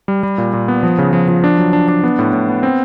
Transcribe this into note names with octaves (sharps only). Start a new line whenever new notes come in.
G3
G3
A#2
A#2
B3
F3
C#3
F3
F3
D4
F#3
D4
D4
B3
A2
A2
B3
C4